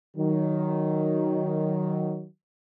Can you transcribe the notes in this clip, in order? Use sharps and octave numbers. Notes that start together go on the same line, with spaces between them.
D#3 F#3